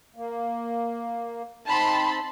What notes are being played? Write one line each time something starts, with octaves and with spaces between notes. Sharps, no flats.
A#3
C4 D#4 A5 B5 C6